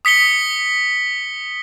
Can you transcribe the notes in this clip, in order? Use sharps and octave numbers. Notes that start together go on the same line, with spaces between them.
D#6 B6 C#7 G7